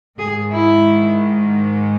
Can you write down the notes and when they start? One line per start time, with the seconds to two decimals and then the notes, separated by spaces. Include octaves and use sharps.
0.18 G#2 D#3 G#3 G#4
0.54 E4